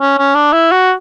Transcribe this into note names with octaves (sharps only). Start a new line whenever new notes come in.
C#4
C#4
D4
E4
F#4